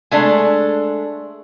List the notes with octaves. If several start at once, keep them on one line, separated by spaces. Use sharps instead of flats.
G#3 A3 D4